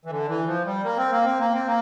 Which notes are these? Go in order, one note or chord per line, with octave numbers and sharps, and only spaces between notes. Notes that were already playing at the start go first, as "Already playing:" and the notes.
E3
D3
E3
F3
G3
A#3
C4
A#3
C4
A#3
C4
A#3